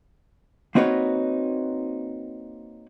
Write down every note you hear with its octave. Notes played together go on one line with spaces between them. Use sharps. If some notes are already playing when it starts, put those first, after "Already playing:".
A#3 C4 D#4 F#4 B4 C#5